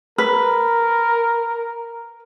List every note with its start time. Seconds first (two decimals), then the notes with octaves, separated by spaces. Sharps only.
0.18 A#4 B4